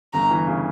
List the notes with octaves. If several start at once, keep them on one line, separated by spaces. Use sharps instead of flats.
G1 A#5
E3
C#3